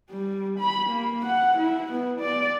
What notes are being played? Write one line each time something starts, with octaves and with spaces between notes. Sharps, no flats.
G3
B5
A#3
F#5
E4
B3
D5